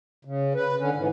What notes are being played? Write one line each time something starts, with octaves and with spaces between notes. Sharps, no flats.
C#3
B4
D3 C#4
G#2 E3